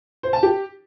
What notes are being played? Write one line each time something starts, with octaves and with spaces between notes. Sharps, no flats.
C5
A5
G4